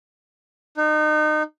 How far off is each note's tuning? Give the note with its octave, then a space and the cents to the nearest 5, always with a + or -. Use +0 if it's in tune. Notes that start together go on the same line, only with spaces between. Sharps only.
D#4 -30